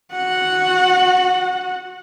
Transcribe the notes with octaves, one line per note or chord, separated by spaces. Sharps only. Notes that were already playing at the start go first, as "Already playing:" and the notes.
F#4 F#5